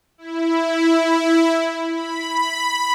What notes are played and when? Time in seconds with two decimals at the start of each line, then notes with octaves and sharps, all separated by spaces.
0.18 E4
1.88 B5